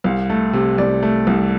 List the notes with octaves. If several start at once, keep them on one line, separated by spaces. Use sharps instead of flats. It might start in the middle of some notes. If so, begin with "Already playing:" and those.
C2 F5
A3
C3
C2 D5
A3
C2